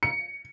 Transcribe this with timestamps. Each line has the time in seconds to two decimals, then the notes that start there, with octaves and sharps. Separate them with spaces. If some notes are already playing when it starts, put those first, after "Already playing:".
0.03 C#7